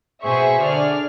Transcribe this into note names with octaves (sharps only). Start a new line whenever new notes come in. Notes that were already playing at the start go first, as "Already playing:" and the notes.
B2 G#4 C5 E5 C#6
D3 G#4 D5 F6